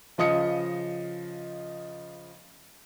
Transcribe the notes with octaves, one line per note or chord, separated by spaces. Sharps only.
C#3 F3 D#5 D#6 C#7